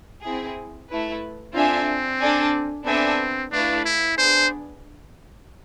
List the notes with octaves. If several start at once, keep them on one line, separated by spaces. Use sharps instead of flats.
C4 E4 G#4
A3 E4 B4
C4 D4 F4 A4 E5 G#5
D4 A4 D5 G#5
B3 C4 D4 A4 E5 G#5
A3 D4 E4 B4 F5
E4
B3 D4 G#4 C5